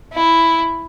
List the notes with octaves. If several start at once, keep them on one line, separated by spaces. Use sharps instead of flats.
E4